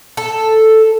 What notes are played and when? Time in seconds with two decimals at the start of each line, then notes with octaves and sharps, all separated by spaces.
0.17 A4